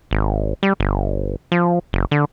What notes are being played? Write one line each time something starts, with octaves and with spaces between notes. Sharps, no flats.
G#1
G3
G1
F3
F#1
D3